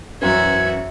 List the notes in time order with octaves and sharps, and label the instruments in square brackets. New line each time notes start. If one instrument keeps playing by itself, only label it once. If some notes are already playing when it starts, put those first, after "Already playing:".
[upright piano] F#2 E3 C5 [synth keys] C#4 B4 [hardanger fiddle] F#4 E5 [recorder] G#6